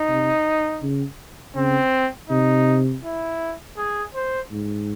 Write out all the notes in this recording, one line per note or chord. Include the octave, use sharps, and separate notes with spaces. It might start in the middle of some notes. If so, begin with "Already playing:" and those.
Already playing: D#4
C3
C#3
C#3 C4
C3 D#4
E4
G#4
C5
G#2